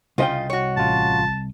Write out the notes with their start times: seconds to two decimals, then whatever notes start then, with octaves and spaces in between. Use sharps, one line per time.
0.18 C2 C#3 F4 D#5 G5
0.50 F#4 C#5
0.77 A1 F4 A5